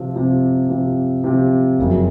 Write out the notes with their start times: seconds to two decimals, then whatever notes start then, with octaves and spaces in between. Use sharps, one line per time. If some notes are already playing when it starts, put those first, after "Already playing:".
Already playing: C3 F3 C4
0.16 C3 F3 C4
0.69 C3 F3 C4
1.24 C3 F3 C4
1.79 F#1 F2 C#3 F#3